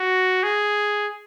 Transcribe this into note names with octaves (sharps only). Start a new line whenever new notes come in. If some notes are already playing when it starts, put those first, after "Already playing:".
Already playing: F#4
G#4